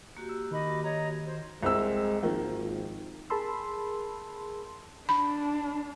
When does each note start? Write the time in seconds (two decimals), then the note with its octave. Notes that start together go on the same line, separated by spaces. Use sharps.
0.17 A#3 F#4 G4
0.29 E6
0.51 D#3 D#5 B5 D6
0.83 C#5 D#5 A#5
1.25 C5
1.63 C2 G#3 C4 E6
2.23 G#1 D#3 F3 A#3
3.30 G#4 A#4 A5 B5 C6 E6
5.09 D4 B5